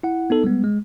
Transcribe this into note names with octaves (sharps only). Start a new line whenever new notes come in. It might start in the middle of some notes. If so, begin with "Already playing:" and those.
E4 F#5
B3 D#4 A4
G3 G#3 B3
G#3